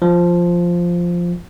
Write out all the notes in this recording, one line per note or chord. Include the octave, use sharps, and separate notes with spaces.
F3